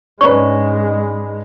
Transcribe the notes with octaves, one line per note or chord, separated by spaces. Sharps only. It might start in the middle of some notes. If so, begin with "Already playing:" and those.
G#2 G#3 C#4 D4 B4 C#6